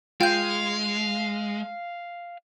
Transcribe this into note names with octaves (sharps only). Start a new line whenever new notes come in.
G#3 F4 F5 G5 G6